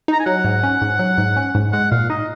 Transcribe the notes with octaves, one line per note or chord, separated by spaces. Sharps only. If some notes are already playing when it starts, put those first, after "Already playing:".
D#4 A#5
G#5
F#3 F#5
G#2
C#4
G#2
F#3
G#2
C#4
G#2
G#3 F#5
A#2 F5
D#4 D#5